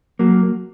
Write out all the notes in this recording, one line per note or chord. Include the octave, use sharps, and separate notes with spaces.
F#3 A#3